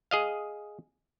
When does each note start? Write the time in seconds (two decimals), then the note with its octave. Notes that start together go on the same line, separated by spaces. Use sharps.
0.11 G#4 D#5 F5